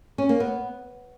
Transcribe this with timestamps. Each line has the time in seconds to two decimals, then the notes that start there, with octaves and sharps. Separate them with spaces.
0.18 C#4
0.29 A#3
0.40 B3